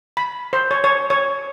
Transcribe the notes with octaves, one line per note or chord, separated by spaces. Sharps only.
B5
C5
C#5
C#5
C#5